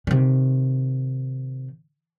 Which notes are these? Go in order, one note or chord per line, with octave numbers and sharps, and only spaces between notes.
C3 D#3